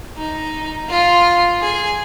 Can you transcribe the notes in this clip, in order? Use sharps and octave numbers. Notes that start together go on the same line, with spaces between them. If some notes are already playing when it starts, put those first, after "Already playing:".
D#4
F4
G#4